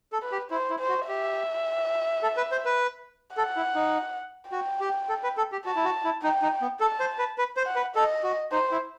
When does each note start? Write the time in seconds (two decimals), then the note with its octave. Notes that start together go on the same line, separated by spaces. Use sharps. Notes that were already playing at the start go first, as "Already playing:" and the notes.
0.12 A4
0.23 B4
0.32 G4
0.51 E4 C5
0.70 E4
0.79 C5
0.89 F#4
1.08 G4 E5
2.22 A4
2.37 B4
2.52 C5
2.65 B4
3.37 A4 F#5
3.56 E4
3.75 D#4
4.51 F#4 G5
4.80 G4
5.09 A4
5.23 B4
5.37 A4
5.52 G4
5.66 F#4 A5
5.76 E4
5.85 F#4
6.04 E4
6.23 D#4 G5
6.42 D#4
6.62 B3
6.80 A4 A5
7.00 C5
7.19 B4
7.38 B4
7.57 C5
7.66 F#5
7.76 B4
7.95 A4 D#5
8.23 F#4
8.52 D#4 C5
8.71 E4